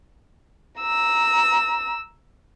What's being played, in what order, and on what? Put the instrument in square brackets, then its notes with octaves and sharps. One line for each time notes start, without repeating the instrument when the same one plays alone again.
[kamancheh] A#5 E6